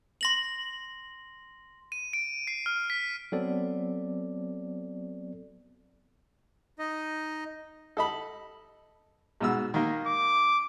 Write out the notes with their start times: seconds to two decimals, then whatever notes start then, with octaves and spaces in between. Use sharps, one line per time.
0.21 C6 A#6 F#7
1.92 D#7
2.13 D7
2.47 C7
2.66 F6
2.90 B6
3.32 F#3 B3 C4 A4 D5
6.79 D#4 D#5
7.97 A4 D#5 B5
9.41 G#2 B2 E6
9.74 D#3 A#3
10.07 D6